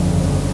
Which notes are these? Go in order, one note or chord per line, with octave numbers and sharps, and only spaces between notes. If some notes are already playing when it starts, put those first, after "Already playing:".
Already playing: G1 F2 C#3